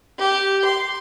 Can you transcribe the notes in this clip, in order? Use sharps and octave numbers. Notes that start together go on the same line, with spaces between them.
G4
C6